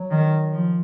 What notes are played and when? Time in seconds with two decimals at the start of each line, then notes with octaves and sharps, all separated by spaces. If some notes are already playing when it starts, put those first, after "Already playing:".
Already playing: F#3
0.11 D#3
0.52 F3